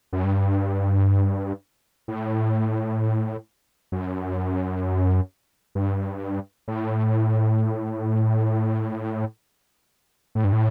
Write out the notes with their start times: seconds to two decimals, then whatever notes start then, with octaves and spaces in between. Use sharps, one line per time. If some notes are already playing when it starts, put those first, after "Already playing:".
0.13 F#2
0.24 G2
2.08 A2
3.92 F#2
5.75 G2
6.68 A2
10.35 A2
10.44 G2
10.52 A2